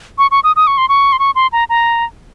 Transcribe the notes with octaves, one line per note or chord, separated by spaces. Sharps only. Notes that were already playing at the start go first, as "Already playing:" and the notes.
C#6
C#6
D#6
D#6
C#6
C6
C#6
C6
C#6
C6
A#5
A#5